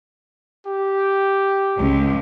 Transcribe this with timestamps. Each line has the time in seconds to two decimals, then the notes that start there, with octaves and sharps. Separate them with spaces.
0.66 G4
1.78 C#2